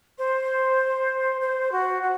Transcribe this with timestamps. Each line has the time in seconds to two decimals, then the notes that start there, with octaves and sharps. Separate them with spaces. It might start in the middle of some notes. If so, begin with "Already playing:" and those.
0.18 C5
1.40 C5
1.71 F#4
2.02 F#4